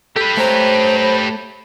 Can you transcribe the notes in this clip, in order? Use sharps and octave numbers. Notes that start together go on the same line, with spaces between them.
G4 A4 B4
A3 C5 C#5 A#5